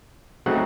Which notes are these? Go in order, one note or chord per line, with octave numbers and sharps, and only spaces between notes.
C#3 F#3 A3 C4 D#4 F#5